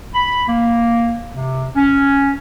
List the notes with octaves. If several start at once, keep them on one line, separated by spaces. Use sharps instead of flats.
B5
A#3
C3
C#4